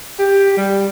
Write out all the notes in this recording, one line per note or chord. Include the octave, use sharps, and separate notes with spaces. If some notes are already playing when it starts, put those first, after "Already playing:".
G4
G3